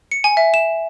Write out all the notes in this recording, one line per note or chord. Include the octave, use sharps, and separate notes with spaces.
C#7
G#5
E5
E7